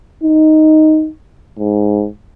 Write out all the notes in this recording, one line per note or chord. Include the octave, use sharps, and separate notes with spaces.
D#4
G#2